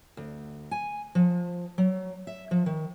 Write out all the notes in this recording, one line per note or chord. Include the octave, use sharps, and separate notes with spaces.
D2
G#5
F3
F#3
E5
F3
D#3